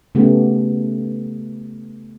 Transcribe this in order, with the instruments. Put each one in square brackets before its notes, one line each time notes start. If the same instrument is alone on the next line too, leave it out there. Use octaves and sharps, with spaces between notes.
[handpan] C#3 A3 B3 G4